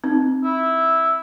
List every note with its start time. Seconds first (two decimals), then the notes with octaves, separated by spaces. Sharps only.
0.04 C4 D#4
0.44 E4